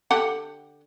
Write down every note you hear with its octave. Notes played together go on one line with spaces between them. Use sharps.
D3 G4 F#5